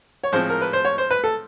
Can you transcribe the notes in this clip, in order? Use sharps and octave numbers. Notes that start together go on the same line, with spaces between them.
C#5
A2 F3 G#3 C4 C5
A#4
B4
C5
C#5
C5
B4
A4